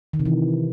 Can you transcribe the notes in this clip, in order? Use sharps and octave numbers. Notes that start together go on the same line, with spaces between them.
D#3
C3
E3